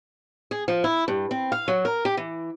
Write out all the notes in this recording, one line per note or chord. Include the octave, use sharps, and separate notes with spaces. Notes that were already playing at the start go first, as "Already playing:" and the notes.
G#4
F3
E4
G2
C4
F5
F#3
A#4
G4
E3